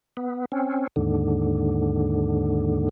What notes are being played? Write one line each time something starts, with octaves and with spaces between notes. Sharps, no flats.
B3
C4 C#4
D#2 G#2 D3